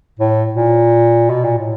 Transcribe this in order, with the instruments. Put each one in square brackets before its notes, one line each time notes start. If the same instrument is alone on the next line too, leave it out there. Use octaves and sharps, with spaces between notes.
[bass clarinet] A2
A#2
B2
A#2
A2